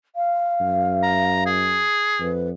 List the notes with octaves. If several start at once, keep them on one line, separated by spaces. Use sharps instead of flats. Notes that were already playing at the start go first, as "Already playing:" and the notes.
F5
F#2
A#5
G#4
F2 B4